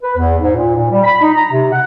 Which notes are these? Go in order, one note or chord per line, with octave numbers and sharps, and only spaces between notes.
B4
E2
G#2
A#2
A#2
G3
B5
D#4
A#5
C3
F#5